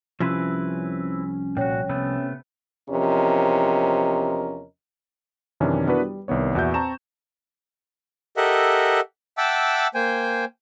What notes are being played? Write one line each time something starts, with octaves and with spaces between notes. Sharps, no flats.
C2 F3 C4 C#4 E4 B4
A#2 F#4 C#5 G5
C3 A3 B3
E2 C3 F3 C#4 A#4 D#5
F#2 C3 D#3 E3 C#4 D4
B3 D4 E4 F#4 A#4 B4
G3
C2 D#3 B3 C#5
E2 A#2 F#4 D5 E5 G6
C4 A5 A#5 C#6 E7
G4 A4 A#4 D#5 E5 F#5
E5 F#5 G5 A5 D6 E6
A#3 C5 G5 G#5